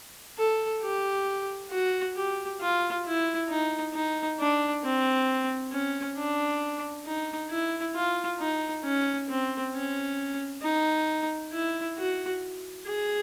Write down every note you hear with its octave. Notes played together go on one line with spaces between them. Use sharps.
A4
G4
F#4
G4
F4
E4
D#4
D#4
D4
C4
C#4
D4
D#4
E4
F4
D#4
C#4
C4
C#4
D#4
E4
F#4
G#4